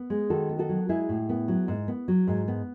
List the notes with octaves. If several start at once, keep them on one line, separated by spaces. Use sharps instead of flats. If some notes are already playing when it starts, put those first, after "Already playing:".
Already playing: B3
G#3
D#3 F#4 A4
B3
F#4 A4
F#3
G#3 E4 G#4
A2
B3
F#3
G#2
B3
F#3
G#2
B3